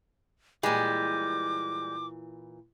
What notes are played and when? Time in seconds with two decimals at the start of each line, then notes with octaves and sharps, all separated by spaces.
0.63 A#2 E3 G3 G#3 D6